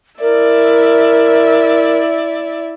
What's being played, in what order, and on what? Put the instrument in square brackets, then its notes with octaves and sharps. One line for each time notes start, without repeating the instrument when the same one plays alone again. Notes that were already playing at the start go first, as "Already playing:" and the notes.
[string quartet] E4 D5 E5 [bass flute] A#4